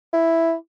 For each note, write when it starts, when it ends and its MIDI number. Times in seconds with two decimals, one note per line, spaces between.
0.13 0.54 64